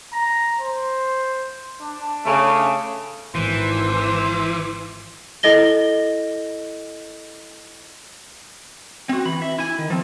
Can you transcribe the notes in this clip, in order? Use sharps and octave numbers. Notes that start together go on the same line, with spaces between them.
A#5
C5
D4
C#3 A3
G#1 E3 C5
E4 A4 D#5 A#6 G7
C4 F#4
E3 B5
E5
E4 G#5
D#3
F3 C4